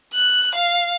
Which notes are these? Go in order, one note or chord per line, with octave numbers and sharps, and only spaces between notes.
F#6
F5